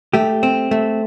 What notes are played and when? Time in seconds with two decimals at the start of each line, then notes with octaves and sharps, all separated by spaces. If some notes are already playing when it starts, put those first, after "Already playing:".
0.13 A3 G4
0.43 C4
0.71 A3